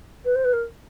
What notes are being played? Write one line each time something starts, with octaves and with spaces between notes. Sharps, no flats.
B4
C5
B4
A#4